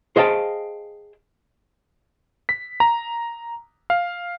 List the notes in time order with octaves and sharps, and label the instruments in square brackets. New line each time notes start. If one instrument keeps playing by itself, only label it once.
[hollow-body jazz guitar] G#4 C5 D#5 F5 G5 A5
[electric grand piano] B6
A#5
F5